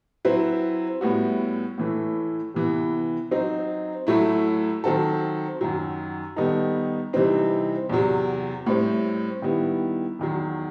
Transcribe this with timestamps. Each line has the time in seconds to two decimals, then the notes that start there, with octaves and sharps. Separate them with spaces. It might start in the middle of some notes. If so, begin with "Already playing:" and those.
0.25 F#3 C4 E4 B4
1.01 A2 G3 B3 F#4
1.78 A2 E3 A3
2.54 C3 E3 B3
3.31 F#3 C4 D#4
4.07 A2 F#3 A3 E4
4.84 D#3 F#3 C4 F#4 A4
5.61 F#2 D#3 F#3
6.36 D#3 G3 B3 D#4 A4
7.13 C3 E3 G3 C4 D#4
7.90 E2 C3 F#3
8.66 A2 G3 C4
9.42 D#3 G3 B3 E4
10.19 E2 D#3 F#3